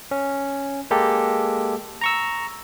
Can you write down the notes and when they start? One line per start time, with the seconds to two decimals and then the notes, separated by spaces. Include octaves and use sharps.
0.11 C#4
0.91 G#3 A#3 G4 A4
2.01 A#5 C#6 E6